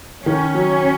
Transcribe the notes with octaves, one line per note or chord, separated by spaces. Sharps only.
D#3 C#4
F#3